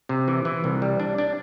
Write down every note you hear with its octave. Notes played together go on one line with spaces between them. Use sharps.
C3
E3
E3
C2
G3
D4
D4